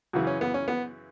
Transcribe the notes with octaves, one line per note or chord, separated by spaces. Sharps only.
F#2 C#3 E3 F#4
C#4
B3
C#4
B3